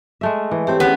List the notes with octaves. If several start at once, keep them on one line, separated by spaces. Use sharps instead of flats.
G#3 A3 E5
E3
A3 C4 G4 C#5
B3 C#4 G#4